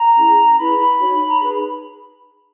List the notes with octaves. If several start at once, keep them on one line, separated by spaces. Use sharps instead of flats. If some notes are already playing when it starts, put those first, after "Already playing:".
Already playing: A#5
C#4 E4 G#4
E4 G#4 B4 B5
D#4 F#4 C#5
A#5
D#4 G#4 B4 B5